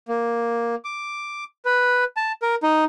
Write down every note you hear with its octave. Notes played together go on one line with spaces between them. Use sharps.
A#3
D6
B4
A5
A#4
D#4